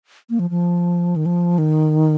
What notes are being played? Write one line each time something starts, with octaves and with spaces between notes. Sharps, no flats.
A#3
F3
F3
D#3
F3
D#3